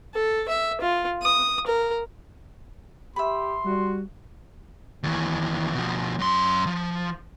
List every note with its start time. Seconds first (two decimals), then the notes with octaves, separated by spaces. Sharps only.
0.14 A4
0.49 E5
0.81 F4
1.22 D#6
1.67 A#4
3.16 G4 E5 B5 C6
3.65 G3 F#4
5.03 D#2 E3
5.75 B2 F3
6.19 F#2 C6
6.67 F3